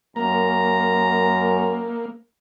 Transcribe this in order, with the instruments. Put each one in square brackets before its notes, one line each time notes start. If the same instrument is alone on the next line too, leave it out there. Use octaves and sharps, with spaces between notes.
[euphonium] F#2 [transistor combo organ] A#3 [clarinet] A#5